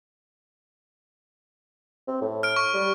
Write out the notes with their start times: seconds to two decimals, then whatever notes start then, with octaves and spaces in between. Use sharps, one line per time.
2.08 C4
2.21 A2
2.43 F6 D7
2.56 C#6
2.74 G3